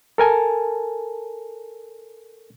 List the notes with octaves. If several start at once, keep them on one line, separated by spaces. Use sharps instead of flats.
A4 A#4 G#5 A5